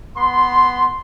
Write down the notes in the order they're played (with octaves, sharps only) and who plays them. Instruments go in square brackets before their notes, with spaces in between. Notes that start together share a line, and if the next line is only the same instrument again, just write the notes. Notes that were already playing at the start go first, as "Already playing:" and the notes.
[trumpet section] B3 C6